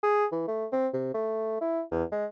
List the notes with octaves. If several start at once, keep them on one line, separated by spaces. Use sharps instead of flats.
G#4
E3
A3
C4
C3
A3
E4
E2
G#3